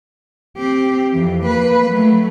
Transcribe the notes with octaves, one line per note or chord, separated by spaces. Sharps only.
C4 G4
F2 E3
A#3 B4
F#3 A3